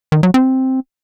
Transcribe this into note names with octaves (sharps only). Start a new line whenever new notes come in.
D#3
F#3
C4